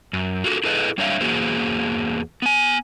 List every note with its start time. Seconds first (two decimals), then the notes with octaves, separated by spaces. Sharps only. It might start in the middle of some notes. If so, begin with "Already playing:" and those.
0.13 F#2
0.44 F4 F#4 A4
0.64 E4 G#4 A4 B4 D#5
0.98 G3 D4 C#5 E5 F5
1.21 E2 E3 A#3 F#4 G#4 C5
2.42 B3 G#5